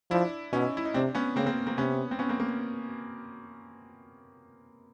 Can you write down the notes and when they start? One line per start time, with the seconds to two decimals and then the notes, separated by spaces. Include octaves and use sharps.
0.11 F3 D4 E4
0.53 B2 C#4 D#4
0.77 E4
0.85 D#4
0.94 C3 C4 D4
1.15 B3 C#4
1.36 C#3 A#3 C4
1.46 A#3 C4
1.67 A#3 C4
1.78 C3 B3 C#4
2.11 C4
2.19 B3 C#4
2.29 A#3 C4
2.40 A#3